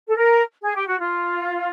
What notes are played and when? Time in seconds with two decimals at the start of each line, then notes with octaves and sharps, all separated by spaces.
0.09 A4
0.17 A#4
0.64 G#4
0.75 G4
0.87 F#4
0.98 F4